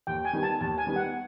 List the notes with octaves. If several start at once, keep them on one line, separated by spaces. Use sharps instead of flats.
D#2 G5
G#5
D#3 G3 B3
A5
D#2 A5
G#5
D#3 G3 B3
F#5